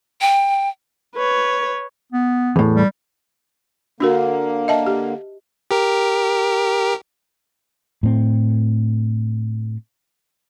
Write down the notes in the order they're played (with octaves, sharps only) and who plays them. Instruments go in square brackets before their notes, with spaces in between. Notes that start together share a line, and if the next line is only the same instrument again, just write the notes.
[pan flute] G5
[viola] B4 C#5
[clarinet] B3
[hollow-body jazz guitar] E2 A2
[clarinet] G3
[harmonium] D3 A#3 [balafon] D4 F#4 A#4
[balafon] D#5 E5 A5
G4
[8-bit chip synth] G4 A#4
[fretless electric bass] A2 C4